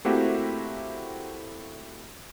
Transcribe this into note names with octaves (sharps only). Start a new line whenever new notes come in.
A3 A#3 C4 E4 F#4 G4